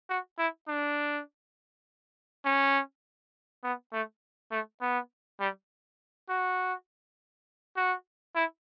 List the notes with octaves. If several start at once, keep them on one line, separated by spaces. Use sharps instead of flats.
F#4
E4
D4
C#4
B3
A3
A3
B3
G3
F#4
F#4
E4